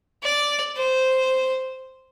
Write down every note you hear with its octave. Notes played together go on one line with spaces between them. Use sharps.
D5
C5